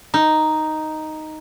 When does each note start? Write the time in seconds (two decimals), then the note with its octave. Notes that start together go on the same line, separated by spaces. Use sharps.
0.14 D#4